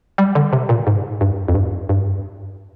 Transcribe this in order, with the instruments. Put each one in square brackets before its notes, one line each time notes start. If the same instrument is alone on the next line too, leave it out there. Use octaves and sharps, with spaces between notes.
[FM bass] G3
D3
C3
A#2
G#2
G2
F2
G2
G2